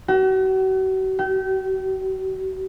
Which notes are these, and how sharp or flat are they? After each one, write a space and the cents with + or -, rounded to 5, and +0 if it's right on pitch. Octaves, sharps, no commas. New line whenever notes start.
F#4 +40
G4 -35